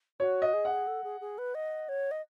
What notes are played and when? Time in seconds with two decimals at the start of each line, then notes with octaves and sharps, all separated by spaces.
0.20 F#4 C#5
0.42 D#5
0.53 G#4
0.65 F#5
0.87 A4
1.04 G#4
1.21 G#4
1.38 B4
1.55 D#5
1.89 C#5
2.11 D#5